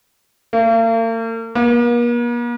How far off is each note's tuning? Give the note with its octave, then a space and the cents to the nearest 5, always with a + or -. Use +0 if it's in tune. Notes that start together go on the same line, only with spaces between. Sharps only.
A#3 -45
A#3 +45